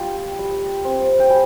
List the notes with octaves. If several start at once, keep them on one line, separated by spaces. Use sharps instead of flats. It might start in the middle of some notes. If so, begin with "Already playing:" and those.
Already playing: G3 F4 G5
G3
C4
G5
G3 G#5